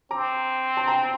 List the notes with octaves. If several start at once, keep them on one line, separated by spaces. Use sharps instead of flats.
C4 A#5 D6
A5 C6
G5 A#5